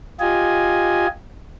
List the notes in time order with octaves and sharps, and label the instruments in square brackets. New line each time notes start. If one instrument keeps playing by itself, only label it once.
[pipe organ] F4 G4 D#5 G#5